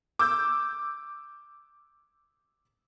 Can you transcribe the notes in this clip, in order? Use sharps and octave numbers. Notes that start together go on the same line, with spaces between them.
D6 E6 G6